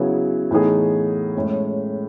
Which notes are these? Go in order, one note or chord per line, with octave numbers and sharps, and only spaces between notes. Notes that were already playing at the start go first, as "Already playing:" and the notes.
Already playing: C#3 F#3 B3 E4 G#4
A2 E3 B3 D#4 G#4
A2 G#3 C#4